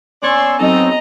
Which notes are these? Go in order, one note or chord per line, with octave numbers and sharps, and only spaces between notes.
B3 C#4 C#5 D5 C6 E6
F#3 C4 D#4 A4 D#5 A#5